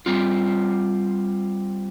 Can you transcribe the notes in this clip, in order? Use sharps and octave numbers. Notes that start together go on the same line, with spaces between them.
G3 C4 F4